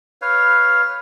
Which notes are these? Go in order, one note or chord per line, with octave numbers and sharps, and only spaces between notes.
B4 C#5 F5